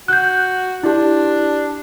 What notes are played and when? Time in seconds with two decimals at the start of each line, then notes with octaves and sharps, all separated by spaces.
0.08 F#4 F#6 G6
0.84 D4 E4 G4